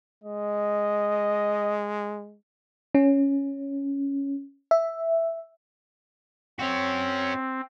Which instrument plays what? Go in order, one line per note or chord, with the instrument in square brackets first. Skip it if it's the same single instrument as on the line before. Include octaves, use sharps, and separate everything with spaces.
[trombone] G#3 [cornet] D#5
[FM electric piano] C#4
E5
[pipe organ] C4 [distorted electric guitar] C#4 F#4